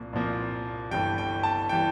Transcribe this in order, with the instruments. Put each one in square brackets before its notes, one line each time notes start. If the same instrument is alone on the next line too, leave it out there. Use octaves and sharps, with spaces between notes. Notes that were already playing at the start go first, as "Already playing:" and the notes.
Already playing: [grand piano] C2 A#2 F3 A#3
C2 A#2 F3 A#3
G1 G2 E3 G3 G5
G5
A5
E3 G3 G5